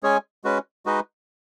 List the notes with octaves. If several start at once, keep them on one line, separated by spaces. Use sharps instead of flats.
G#3 C#4 G#4 C#5 G#5
G#3 C#4 F#4 B4
G#3 D#4 F#4 B4 D#5